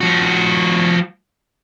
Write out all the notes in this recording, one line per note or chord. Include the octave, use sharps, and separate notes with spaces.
F3 F#4